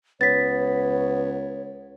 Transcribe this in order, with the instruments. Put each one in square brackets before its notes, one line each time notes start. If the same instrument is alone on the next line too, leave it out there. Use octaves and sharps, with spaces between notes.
[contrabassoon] C#2 [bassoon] B3 [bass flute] C#5 [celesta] A6 B6